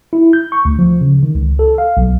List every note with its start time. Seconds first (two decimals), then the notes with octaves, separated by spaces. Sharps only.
0.13 E4
0.33 G6
0.52 C#6
0.65 D2
0.79 F3
1.01 C#3
1.23 D#3
1.35 C#2
1.59 A4
1.78 F5
1.97 B1